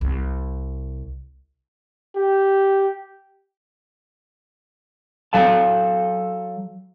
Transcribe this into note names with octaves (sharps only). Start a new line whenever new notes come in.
C2
G4
F#3 A4 F5 A5